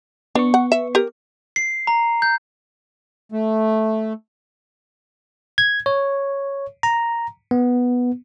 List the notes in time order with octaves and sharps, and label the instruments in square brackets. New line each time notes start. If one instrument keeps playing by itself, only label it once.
[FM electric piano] B3 C#6 [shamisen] D4
[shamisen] F#5
E5
G4 A#4
[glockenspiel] C7
A#5
G6
[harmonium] A3
[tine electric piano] G#6
C#5
A#5
B3